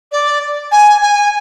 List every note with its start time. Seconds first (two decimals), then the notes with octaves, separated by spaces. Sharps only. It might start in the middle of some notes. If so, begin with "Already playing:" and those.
0.12 D5
0.71 G#5
1.01 G#5